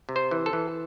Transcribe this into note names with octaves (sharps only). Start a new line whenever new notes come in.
C3
C5
E3
A4
E3